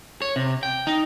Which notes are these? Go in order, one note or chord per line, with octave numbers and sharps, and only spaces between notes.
C#5
C3
G5
D#4